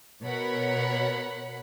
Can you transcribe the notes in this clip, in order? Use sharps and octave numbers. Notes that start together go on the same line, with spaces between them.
B2 A#4 C#5 F#5 B5